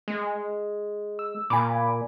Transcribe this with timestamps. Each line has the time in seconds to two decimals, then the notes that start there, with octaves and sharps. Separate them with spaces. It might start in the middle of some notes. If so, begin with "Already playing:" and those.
0.08 G#3
1.19 E6
1.50 A#2 G#5 B5 D6